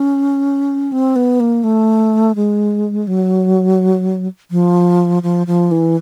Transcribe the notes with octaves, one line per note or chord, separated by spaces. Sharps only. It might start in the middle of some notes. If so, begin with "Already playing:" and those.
Already playing: C#4
C4
B3
A#3
A3
G#3
F#3
F3
F3
F3
E3